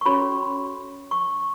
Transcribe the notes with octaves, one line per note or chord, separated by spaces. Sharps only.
C#6
C#4 F#4 A4 C#5 B5
C#6